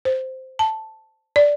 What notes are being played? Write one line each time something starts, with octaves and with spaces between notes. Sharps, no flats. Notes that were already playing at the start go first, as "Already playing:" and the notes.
C5
A5
D5